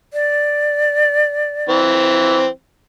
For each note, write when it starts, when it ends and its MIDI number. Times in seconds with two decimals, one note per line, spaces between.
0.13 1.79 74
1.69 2.46 52
1.69 2.46 60